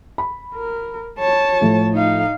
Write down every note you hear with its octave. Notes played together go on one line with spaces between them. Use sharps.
B5
A#4
C#5 A5
A2 F3
D#4 F5